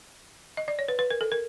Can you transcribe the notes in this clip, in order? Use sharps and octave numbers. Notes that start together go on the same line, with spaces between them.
D#5
D5
C#5
B4
B4
A#4
A4
A#4